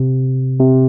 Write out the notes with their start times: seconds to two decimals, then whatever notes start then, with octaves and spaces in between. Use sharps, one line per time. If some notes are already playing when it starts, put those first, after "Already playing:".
Already playing: C3
0.60 C3